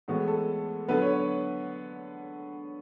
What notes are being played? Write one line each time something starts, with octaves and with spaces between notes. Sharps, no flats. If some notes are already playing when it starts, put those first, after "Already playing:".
A2 E3 G#3 B3 F#4
A4
D3 F#3 B3 B4
C#5
C#5